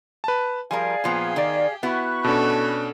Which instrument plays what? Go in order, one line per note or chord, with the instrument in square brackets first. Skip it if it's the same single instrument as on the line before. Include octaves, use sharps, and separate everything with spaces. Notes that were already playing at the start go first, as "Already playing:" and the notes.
[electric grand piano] B4 A5
[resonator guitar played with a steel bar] F3 G3 A#4 [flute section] G#4 F5 [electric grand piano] G#5
[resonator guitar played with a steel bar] A#2 F3 B3 [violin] G4
[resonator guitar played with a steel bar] D#3 D5
[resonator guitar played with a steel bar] B3 E4 F#4 [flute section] B5 C#6 F#6
[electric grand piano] B2 C#4 D4 [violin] A4